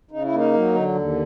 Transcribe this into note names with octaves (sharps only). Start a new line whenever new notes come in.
C#3 D#4
E4
A#3 D#4
F#3
D3
D#2